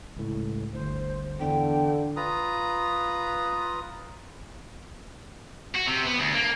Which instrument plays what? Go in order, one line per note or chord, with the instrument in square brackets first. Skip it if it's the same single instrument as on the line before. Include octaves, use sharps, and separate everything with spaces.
[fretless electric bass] C#2 A2
[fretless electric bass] G1 D2 [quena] C5
[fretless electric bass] E2 [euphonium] D3 [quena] G5
[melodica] F4 B4 A#5 D#6
[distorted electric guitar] F#4
C3
B3
D2
A#3